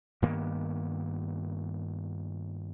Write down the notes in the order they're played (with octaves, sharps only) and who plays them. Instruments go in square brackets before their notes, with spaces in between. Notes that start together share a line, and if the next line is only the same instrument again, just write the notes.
[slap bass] G2 D#3 A#3 B3